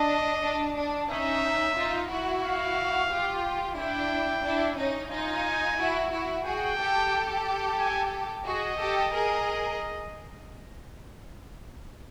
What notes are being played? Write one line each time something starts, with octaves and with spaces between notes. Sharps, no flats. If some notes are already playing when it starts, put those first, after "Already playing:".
Already playing: D4 D#5
D4
D4
C#4 D#4 E5
D#4 F4
E4 F#4
F5
F4 G4
D4 E4 G5
D4 E4
C#4 D#4
D#4 F4 G#5
E4 F#4
E4 F#4
F#4 G#4 G5
G4 A4
G#5
F#4 G#4 D#5
G4 A4
G#4 A#4